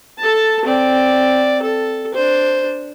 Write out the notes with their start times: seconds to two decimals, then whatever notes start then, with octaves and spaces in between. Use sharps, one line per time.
0.18 A4 A5
0.65 C4 D5
1.62 A4
2.14 D4 C5